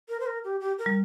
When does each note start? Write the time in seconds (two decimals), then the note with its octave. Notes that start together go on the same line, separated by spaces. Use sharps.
0.09 A#4
0.20 C5
0.26 A#4
0.44 G4
0.61 G4
0.78 A#4
0.86 G3